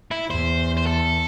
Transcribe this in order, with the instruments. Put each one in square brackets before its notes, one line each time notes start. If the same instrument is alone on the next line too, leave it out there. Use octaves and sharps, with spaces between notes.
[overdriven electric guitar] E4
[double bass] E2 [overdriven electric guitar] C5
[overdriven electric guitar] C5
A4